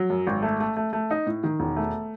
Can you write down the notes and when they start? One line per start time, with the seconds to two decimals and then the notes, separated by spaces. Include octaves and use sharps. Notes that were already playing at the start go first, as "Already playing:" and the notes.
Already playing: F#3
0.10 F#2
0.27 G#1
0.42 A3
0.60 A3
0.77 A3
0.93 A3
1.11 D#4
1.27 A2
1.44 D#3
1.60 E1
1.76 A3